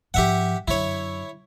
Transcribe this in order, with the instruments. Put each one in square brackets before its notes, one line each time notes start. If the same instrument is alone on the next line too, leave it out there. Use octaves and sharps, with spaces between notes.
[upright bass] G#2 F3 [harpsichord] G4 E5 F#5
[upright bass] F#2 D3 [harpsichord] E4 C#5